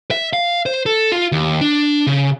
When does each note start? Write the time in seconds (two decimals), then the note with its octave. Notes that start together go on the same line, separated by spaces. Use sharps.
0.11 E5
0.33 F5
0.66 C5
0.86 A4
1.12 F4
1.32 D#2
1.61 D4
2.07 C#3